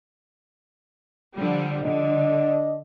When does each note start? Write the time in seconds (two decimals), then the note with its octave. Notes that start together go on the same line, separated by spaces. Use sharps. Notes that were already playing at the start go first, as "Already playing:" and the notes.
1.35 D3 F3 G3
1.83 D3 D4 D#5